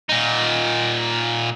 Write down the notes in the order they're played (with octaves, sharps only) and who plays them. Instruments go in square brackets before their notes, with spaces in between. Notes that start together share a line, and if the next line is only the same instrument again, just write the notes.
[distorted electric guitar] A#2 D#4